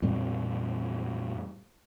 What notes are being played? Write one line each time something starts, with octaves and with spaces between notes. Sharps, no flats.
F2 A#2 G3 C4